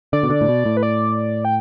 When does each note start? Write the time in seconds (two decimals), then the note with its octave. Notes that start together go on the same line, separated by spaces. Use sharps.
0.13 D3 D5
0.23 B2
0.30 D3
0.41 A2
0.48 B2
0.65 A2
0.77 B4
0.83 D5
1.45 G5